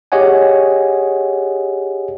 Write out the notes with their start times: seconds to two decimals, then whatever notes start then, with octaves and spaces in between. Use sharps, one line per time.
0.12 G4 G#4 C#5 D#5 F#5 G#5